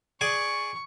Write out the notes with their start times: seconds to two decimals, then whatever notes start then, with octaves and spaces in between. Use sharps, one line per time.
0.21 G#4 D5 G#5 C#6